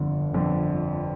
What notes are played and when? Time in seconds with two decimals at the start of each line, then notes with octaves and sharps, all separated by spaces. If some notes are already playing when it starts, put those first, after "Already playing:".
Already playing: G1 F2 D3
0.33 G1 F2 D3